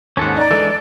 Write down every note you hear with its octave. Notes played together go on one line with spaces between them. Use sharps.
D#2 G#2 C#4 A4 F#5
D#4 D5 A#5
E3 G#3 D4 A4